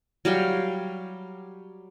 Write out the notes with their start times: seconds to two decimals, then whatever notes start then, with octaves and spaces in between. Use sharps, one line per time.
0.25 F#3 G3 F5 G5